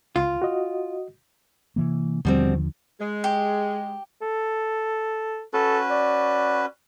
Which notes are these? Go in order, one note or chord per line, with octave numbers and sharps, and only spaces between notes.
C#2 F4
F#4 D#5
C3 E3 A#3
D#2 B2 D3 F3 G3 C4
G#3
G4
A4
C#4 F#4 A4 B4
D5